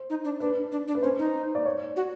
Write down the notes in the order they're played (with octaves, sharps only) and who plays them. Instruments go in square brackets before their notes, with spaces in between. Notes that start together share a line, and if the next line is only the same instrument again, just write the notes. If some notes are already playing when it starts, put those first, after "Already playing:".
Already playing: [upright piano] C5
[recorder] D#4
D4
[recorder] D4 [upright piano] B4
[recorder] D4
D4
[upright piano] B4
[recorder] C#4 [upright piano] C5
[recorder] D#4
[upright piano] D5
C#5
[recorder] F#4